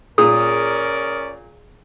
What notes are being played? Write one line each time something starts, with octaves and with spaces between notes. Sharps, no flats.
A#2 C#4 G#4 A#4 D5 D#6